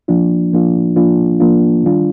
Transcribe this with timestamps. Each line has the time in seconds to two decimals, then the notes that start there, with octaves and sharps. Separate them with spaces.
0.08 F3 A#3 D4 F4
0.53 F3 A#3 D4 F4
0.96 F3 A#3 D4 F4
1.40 F3 A#3 D4 F4
1.83 D#3 G3 D4 F4